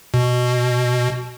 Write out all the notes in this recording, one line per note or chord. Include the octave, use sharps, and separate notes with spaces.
B2